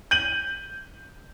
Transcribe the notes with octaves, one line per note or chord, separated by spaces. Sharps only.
G6 D#7 F#7